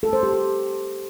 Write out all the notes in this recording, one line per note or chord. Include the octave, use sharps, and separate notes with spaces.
A4
C5
G4
A4